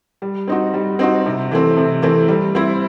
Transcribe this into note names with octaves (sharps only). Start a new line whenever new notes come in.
G3
C4 D#4 F#4
G3
C4 D#4 F#4
C3
E3 A3 C4
C3
E3 A3 C4
G3
C4 E4